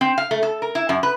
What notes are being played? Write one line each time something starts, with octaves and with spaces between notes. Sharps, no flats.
C4
F5
A3
A4
A#4
E4
F#2
B4